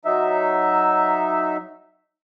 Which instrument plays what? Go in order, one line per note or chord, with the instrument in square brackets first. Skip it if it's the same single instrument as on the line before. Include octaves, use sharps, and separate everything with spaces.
[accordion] F#3 D#4 E5